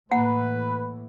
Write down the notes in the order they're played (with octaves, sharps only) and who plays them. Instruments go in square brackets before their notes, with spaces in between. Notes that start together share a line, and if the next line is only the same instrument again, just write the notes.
[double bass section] A2 E3 [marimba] A#3 [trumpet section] B4 [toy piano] F#5